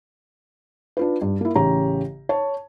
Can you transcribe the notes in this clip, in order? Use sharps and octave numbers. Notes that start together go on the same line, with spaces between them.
D4 F4 B4
G2
A#3 E4
A1 C#3 G4 C#5 A#5
C#5 A5